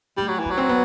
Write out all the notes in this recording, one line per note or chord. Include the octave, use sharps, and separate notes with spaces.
G3 A3
F#3
E3
B3
F#3
C4
B3